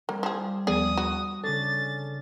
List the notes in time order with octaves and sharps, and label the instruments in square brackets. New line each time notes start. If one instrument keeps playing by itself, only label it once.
[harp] G3 C4 [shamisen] A#3
[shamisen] F3 G#4
[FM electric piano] D#2 F3 B3 [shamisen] G#4 D5 [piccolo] D#6
[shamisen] F#4
[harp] C#3 C#4 D4 [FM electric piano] A4 [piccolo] A6